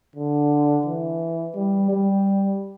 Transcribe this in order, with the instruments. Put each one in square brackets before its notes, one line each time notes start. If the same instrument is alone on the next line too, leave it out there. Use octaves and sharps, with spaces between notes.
[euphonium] D3
E3
G3
G3